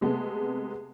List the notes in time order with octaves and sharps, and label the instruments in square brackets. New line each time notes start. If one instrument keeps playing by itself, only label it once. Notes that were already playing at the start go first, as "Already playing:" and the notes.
[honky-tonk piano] C3 G#3 A3 B3